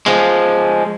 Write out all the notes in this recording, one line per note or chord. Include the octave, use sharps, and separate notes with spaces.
F3 G#3